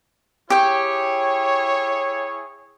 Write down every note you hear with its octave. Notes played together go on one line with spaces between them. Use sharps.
E4 G4 G#4 C#5 G5